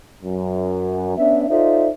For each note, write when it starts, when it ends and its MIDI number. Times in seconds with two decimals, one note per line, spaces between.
0.23 1.13 42
1.16 1.45 59
1.16 1.45 61
1.16 1.45 62
1.16 1.45 76
1.49 1.89 63
1.49 1.89 65
1.49 1.89 69
1.49 1.89 72
1.49 1.89 74
1.49 1.89 76